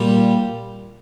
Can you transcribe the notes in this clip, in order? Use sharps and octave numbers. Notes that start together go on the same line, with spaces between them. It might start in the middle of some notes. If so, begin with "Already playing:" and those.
Already playing: A#2 G3 G4